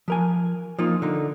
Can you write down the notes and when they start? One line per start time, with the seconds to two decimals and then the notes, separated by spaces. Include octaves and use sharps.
0.08 F3 A#4 G#5
0.79 F3 A#3 D#4 F4
1.02 D3 D#4